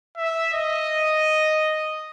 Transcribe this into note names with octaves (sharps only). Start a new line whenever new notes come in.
E5
D#5